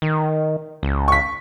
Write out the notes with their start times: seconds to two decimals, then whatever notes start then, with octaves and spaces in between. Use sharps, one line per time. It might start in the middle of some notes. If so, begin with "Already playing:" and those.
0.02 D#3
0.83 C#2
1.08 C#6 B6